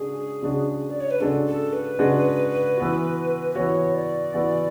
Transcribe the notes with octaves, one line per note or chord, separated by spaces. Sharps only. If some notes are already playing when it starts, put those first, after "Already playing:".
Already playing: C#3 G#3 D4 F#4 G#4
C#3 G#3 D4 F#4
D5
C#5
B4
C#3 G#3 D4 F#4 A4
A4
B4
C#3 G#3 D4 F#4
E3 B3 F#4
B4
E3 B3 F#4 C#5
D5
E3 B3 F#4